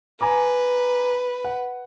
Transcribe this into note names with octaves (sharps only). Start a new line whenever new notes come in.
B4 G#5 A#5 D6
F#5